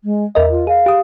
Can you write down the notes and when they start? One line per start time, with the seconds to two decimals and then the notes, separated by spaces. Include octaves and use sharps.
0.03 G#3
0.35 E2 A#4 D#5 E5
0.50 F4
0.67 G#4 F5
0.86 G4 D#6